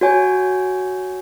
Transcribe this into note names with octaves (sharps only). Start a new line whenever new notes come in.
F#4 C#5 G#5